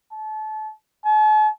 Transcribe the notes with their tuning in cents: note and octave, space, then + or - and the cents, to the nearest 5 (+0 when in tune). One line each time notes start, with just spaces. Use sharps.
A5 -30
A5 -45